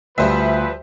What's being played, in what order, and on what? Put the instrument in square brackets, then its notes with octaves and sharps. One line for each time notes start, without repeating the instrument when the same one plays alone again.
[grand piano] D2 [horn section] F3 B4 [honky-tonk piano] G3 C5 E5